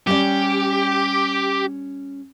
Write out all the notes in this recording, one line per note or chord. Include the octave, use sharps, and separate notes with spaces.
G3 C#4 G4 D5